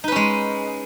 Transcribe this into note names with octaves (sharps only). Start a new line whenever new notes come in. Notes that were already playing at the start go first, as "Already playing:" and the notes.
G#3 C#4 D#4 B4